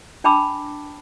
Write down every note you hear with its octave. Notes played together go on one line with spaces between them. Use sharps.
D4 G5 A5 B5 D6 E6